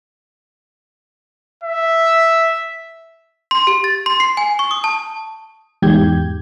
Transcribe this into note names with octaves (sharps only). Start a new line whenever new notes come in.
E5
C6
G4
A6
C6
C7
G#5
C#6
D#6
A5
E2 G#2 G4 G6 G#6